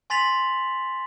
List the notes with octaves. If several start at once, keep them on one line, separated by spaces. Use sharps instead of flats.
G#5 C6 A6 B6 F7 F#7